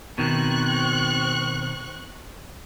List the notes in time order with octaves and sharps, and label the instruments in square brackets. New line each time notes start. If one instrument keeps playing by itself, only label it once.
[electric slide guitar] B2 D#3 [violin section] C4 C#6 F#6